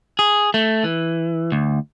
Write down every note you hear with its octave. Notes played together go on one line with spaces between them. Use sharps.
G#4
A3
E3
D2